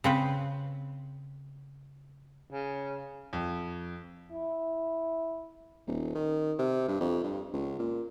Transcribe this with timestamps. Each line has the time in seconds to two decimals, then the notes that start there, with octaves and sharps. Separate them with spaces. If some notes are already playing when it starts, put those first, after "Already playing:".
0.04 C#3 C4 B4
2.51 C#3
3.33 F2
4.32 E4
5.87 D#1
6.15 D#3
6.59 C3
6.88 G2
7.01 F2
7.24 G2
7.54 C#2
7.79 A#2